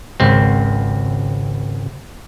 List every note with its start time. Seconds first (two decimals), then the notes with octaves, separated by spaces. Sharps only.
0.20 G#1 C#2 C4